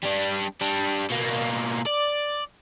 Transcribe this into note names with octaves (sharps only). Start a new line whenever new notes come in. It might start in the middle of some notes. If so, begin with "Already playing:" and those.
G3 D4
G3 D4
B2 A#3
D5